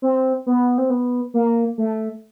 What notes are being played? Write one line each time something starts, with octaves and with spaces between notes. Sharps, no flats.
C4
B3
C4
B3
A#3
A3